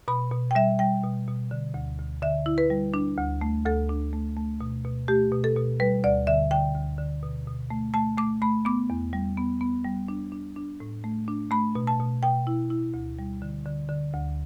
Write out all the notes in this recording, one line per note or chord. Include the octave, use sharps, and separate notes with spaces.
B2 B5
B2
G5
G3 E5
G3 G5
B2
B2
D3
D2
D2
D3 E5
E4
B4
G3
D4
D2
A3
D2 A4
D4
A3
A3
B2
B2
A3 G4
B2
A4
B2
G3 B4
D2 D5
D3 E5
D3 G5
D2
D3
B2
B2
A3
A3 A5
A3 D6
A3 B5
B3 D6
E2
G3
B3
B3
G3
D4
D4
D4
A2
A3
D4
A3 B5
B2
A5
B2
B2 G5
E4
E4
D2
G3
D3
D3
D3
D2